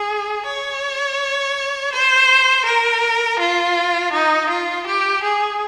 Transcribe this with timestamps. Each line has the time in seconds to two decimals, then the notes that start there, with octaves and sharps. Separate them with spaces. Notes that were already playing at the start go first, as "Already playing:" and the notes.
Already playing: G#4
0.46 C#5
1.92 C5
2.66 A#4
3.39 F4
4.13 D#4
4.49 F4
4.87 G4
5.23 G#4